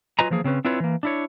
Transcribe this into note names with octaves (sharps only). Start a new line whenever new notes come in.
F#3 F4 B4 D#5 G#5 A#5
E3 F3 A#3 G#4
C#3 C4 C#4 B4
C4 D4 E4 F4 B4 C#5
E3 A#3
D4 E4 C#5